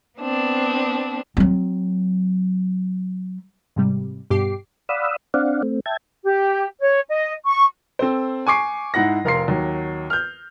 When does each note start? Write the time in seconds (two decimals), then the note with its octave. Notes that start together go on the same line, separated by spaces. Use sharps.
0.18 B3 C4 D4
1.37 F#3 C4
3.76 G#2 C3 G3
4.30 G2 B2 G4 D6 C7
4.89 D5 F5 F#5 B5 D#6 E6
5.34 C4 D4 D5 F5 F#5
5.63 A3 C4
5.86 E5 G5 A5 G#6
6.24 G4
6.81 C#5
7.09 D#5
7.46 C#6
7.99 C4 A4 C5
8.47 G#5 C#6 D6 C7
8.94 G#2 E4 F#5 A#6
9.25 F1 A#4 F5 C6 C7
9.48 D#2 F#3
10.10 F6 G6